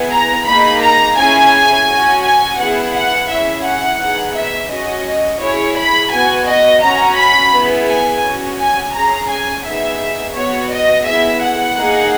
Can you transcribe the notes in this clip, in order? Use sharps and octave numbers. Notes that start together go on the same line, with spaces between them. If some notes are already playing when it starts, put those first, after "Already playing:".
Already playing: B3 E4 G#4
A#5
A#3 D#4 G#4 B5
A#5
C#4 E4 G#4 G#5
C#4 F#4
G#5
B3 E4 G#4 F#5
F#5
C#4 E4 G#4 E5
F#5
B3 D#4 G#4
E5
C#4 F#4 D#5
C#4 E4 G#4 C#5
B5
B3 F#4 G#5
D#5
C#4 F#4 A#5
B5
B3 E4 G#4
G#5
C#4 F#4
G#5
C#4 G#4 A#5
G#5
B3 D#4 G#4 E5
B3 F#4 C#5
D#5
B3 E4 G#4 E5
F#5
A#3 D#4 G#4